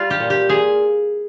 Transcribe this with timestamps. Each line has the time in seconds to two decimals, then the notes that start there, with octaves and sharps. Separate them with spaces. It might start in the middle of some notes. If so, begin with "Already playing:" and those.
Already playing: G3 F4
0.10 G4
0.20 A#2
0.30 G4
0.49 A#2 G#4